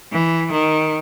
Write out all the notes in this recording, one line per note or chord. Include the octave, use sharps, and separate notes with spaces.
E3
D#3